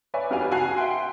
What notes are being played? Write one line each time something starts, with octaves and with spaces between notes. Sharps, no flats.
B4 C#5 D5 E5 G#5
F2 F#4 G4 B4 F5 G#5
C#2 F#4 G#5 A5 F#6 C7
E5 F#5 G5 C6